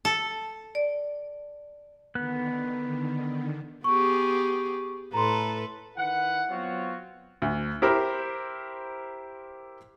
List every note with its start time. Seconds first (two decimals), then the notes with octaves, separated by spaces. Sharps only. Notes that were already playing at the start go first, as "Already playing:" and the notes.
0.05 A4
0.75 D5
2.15 D3 D#3 B3 F#6
3.84 B3 G4 G#4 C#6
5.13 A2 A4 B4 A#5 C6
5.98 D#3 E4 B4 F#5
6.51 F#3 B3 C4 F4 F#4 C#5
7.42 D2
7.82 E4 G4 A#4 C5